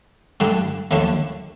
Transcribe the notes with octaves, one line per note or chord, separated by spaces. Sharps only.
G2 D3 G3 D4
D#2 D3 F3 A3 D4